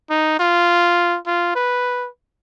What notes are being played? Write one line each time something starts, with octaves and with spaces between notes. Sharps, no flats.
D#4
F4
F4
B4